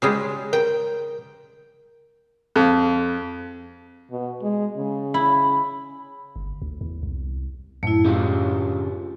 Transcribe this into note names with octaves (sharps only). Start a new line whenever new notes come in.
C#3 G3 G#3
A#4 G5
F2
B2
G#3
C#3
E4
G1
D2
E2
C2
F#2 A2 A3 E4
C#3 D4 F4 G4